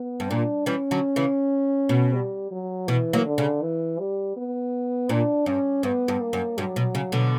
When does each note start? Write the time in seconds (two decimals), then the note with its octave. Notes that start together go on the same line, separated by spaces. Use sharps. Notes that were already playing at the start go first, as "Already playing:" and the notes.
Already playing: B3
0.20 G2
0.29 A#2 D4
0.66 E3 G3 C#4
0.91 D3 F#3
1.16 C#3 E3
1.89 B2
2.15 G3
2.51 F#3
2.88 B2 E3
3.13 F#3 A#3
3.25 D3
3.38 C#3
3.62 E3
3.99 G3
4.37 B3
5.09 A#2 D4
5.46 G2 C#4
5.83 G2 B3
6.08 G2
6.21 A#3
6.33 F#2
6.58 G2 F#3
6.76 B2
6.95 C#3
7.12 B2 D3